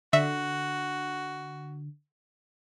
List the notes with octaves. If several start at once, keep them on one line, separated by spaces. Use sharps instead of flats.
D3 F#4 E5